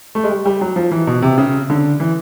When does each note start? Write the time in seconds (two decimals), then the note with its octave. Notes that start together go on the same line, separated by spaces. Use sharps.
0.15 A3
0.24 G#3
0.30 G3
0.46 G3
0.61 F#3
0.76 F3
0.91 E3
1.07 B2
1.22 C3
1.38 C#3
1.70 D3
2.00 E3